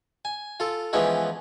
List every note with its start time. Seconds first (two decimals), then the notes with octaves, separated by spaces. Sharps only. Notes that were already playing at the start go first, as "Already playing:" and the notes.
0.25 G#5
0.60 F4 A4
0.93 E3 F3 G#3 B3 C#4 E4